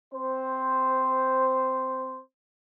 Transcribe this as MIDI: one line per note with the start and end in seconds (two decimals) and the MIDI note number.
0.14 2.19 60
0.14 2.19 72